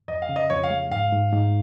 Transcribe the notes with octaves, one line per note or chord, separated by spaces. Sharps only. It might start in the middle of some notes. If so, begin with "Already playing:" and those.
F2 D#5
F5
C#3
D#5
F2 C#5
F5
G#3
G#2 F5
G#2
G#2